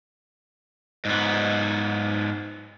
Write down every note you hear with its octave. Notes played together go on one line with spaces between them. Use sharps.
G#2 B3